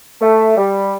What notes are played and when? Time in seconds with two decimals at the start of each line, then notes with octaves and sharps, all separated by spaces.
0.21 A3
0.57 G3